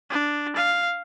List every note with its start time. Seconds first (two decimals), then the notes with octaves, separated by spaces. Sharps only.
0.10 D4
0.56 F5